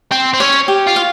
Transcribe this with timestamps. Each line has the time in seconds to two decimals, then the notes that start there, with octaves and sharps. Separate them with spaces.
0.11 C4 C6
0.33 C4
0.40 C#4 C#5
0.68 G4
0.87 F4
0.96 F5